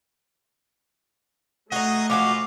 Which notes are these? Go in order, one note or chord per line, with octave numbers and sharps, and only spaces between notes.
A3 D#4 F#4 G#4 D#5
F3 G#3 B3 F4 F#4 D6